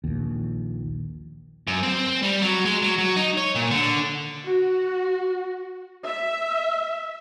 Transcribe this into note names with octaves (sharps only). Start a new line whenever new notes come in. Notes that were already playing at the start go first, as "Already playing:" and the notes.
A#1 D#2
F#2
C4
G3
F#3
G#3
F#3
F#3
D#4
C#5
A#2
D3
F#4
E5